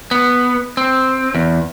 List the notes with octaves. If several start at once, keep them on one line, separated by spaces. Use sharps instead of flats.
B3
C4
E2